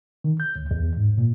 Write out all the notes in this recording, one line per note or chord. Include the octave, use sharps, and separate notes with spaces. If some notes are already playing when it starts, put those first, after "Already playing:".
D#3
G6
D2
E2
G#2
A#2